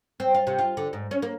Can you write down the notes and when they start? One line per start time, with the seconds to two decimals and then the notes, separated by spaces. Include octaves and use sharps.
0.20 C4
0.34 F4
0.47 C3
0.59 F4
0.77 D3
0.93 G#2
1.11 C#4
1.22 A#3